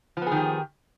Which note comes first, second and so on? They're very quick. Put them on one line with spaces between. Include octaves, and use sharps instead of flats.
F3 B3 G#4 D#3 G4